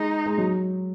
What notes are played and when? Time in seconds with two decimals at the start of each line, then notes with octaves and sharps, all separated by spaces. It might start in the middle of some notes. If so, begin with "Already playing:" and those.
Already playing: G#3 D#4
0.26 G#3
0.38 F#3